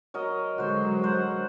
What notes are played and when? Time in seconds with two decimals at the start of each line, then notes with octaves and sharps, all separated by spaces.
0.14 F#3 A#4 D#5
0.58 D3 F#3 G#3 F#4 C5
1.03 C5 F#5